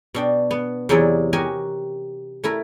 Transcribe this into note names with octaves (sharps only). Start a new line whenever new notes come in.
B2 D4 G5
B3
E2 C3 F#3 D#4 E4 D5
F#4 G4 A#4 D#5 G#5
A3 E4 A#4